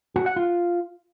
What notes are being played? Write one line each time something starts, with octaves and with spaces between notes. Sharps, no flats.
F#4
F#5
F4